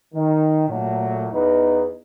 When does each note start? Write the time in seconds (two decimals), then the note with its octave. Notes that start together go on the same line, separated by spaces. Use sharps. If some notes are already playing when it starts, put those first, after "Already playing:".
0.14 D#3
0.68 A#2 F#3 A3
1.32 E2 D#4 B4